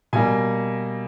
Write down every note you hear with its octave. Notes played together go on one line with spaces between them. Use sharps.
B2 G3 A#3 G#5